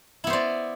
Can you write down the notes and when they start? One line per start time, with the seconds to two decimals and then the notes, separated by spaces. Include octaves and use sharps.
0.24 E4
0.27 B3
0.30 C5
0.33 D5